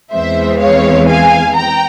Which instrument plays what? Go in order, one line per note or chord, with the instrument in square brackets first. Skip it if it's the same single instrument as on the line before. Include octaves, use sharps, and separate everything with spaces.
[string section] E2 E3 G#3 C4 C5 E5
C#5 F5
F5 G#5
G5 A#5